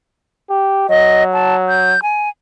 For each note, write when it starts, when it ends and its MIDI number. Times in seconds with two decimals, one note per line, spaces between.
0.50 0.87 67
0.89 1.94 54
0.89 1.24 75
1.33 1.55 81
1.69 2.00 91
2.03 2.29 80